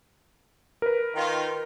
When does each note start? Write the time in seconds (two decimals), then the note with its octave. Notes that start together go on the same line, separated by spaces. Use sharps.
0.82 A#4 B4
1.15 D#3 F4